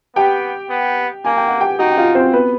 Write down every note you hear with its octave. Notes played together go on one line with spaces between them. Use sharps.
B3 G4 G5
B3
A#3 G#5
G5
F#5
G4 G5
D#4 F#4 F#5
F#5
F4 F5
C4 C5
B3 B4